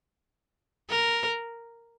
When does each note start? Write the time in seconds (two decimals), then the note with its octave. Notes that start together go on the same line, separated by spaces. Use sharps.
0.89 A#4